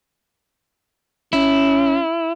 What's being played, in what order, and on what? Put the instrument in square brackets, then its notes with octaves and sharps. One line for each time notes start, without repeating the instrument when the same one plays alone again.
[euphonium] C#4 [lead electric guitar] E4